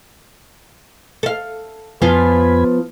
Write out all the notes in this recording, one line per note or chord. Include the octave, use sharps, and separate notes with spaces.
A4 F5
F2 F3 B3 F4 G#5 B5